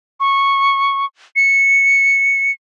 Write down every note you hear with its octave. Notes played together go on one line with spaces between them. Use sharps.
C#6
C#7